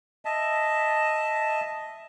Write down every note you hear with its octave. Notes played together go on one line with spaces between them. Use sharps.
D#5 E5 A5